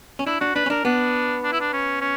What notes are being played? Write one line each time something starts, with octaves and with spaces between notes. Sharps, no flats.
C#4
D4 E4
D4 F#4
D4 B4
C#4
D4 A#4
B3 D4
D4
E4
D4
C#4
C#4